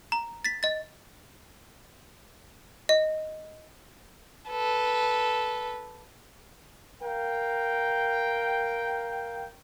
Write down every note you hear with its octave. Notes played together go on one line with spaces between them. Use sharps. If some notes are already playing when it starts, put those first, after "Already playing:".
A#5
A6 B6
D#5 A6
D#5
A4 B4
A#4 F5 G5